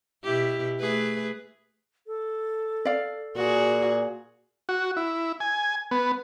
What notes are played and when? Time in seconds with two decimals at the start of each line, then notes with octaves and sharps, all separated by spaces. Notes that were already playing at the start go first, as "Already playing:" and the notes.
0.23 B2 E4 G4
0.80 A3 G#4 B4
2.07 A4
2.85 D5 F5
3.36 A#2 F#4 G#4
4.69 F#4
4.97 E4
5.40 G#5
5.91 B3